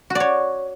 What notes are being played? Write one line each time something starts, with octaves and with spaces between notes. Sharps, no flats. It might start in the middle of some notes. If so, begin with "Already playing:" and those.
F#4
D5
C#5